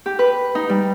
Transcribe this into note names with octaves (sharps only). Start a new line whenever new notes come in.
G4
B4
D#4
G3